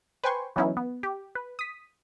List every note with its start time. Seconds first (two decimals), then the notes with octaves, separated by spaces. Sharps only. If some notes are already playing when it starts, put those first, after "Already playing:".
0.24 B4 C5 G5 G#5 C6 C#6
0.56 E3 F#3 B3 C#4 D#4 E4
0.77 B3
1.03 G4
1.35 B4
1.59 D#6 B6